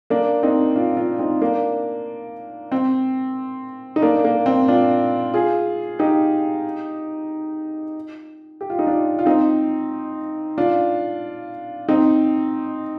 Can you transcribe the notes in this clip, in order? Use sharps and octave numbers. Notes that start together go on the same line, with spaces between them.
A#3 D4
C4 D#4
D4 F4
D4 F4
C4 D#4
A#3 D4
C4
D#4
A#3 D4
A#3
C4
D4 F4
F4 G#4
D#4 G4
G4
F4
D#4
D4 F4
F4
C4 D#4
D4 F4
C4 D#4